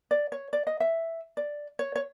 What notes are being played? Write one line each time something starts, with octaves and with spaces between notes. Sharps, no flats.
D5
C#5
D5
D#5
E5
D5
C#5
C#5